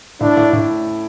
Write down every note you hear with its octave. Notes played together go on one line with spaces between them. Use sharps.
A2 D4
A2
A2